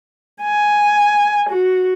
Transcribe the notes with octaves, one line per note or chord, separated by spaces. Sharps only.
G#5
F#4